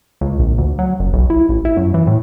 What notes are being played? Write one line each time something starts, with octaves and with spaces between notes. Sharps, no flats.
C#2
A#1
D2
F#3
F#1
B1
E4
A1
E4
F#2
E3
A2